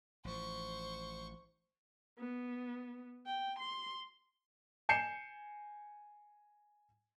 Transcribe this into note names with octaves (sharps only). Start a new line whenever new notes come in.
A1 F3 C5 C#6
B3
G5
C6
G#5 G6 C7 C#7 E7